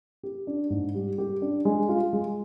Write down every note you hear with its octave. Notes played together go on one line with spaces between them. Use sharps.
G4
D4
G#2
G3
G4
D4
G#3
F4
G#3